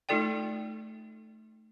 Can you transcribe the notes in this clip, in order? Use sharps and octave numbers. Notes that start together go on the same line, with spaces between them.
A3 D#4 F4 A4 D5 G5